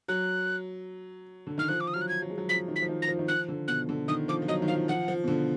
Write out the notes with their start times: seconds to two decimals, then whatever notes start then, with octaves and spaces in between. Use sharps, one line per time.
0.08 F#3 F#6
1.47 D3
1.58 D#3 F6
1.69 F3 F#6
1.81 D6
1.88 D#6
1.94 F#3 F6
2.01 F#6
2.09 G#6
2.22 F#3
2.30 G#3
2.38 F#3
2.49 F3 B6
2.68 D#3
2.76 B6
2.82 F3
2.89 D#3
3.02 A#6
3.08 F3
3.19 D#3
3.28 F3 F#6
3.48 D3
3.68 B2 F#6
3.89 D3
4.08 D#3 D#6
4.28 F3 D6
4.42 F3
4.48 F#3 D#5
4.62 D#3
4.68 F3 F5
4.88 F3 F#5
5.08 F3
5.24 B2
5.28 D3